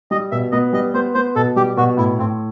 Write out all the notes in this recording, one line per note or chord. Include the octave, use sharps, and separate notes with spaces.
G3 D#5
B2 E5
B3 D#5
G3 D#5
B3 C5
B3 C5
B2 A4
G3 G4
B2 F#4
A2 E4
A2 C4